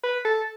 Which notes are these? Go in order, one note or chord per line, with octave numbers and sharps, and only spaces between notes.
B4
A4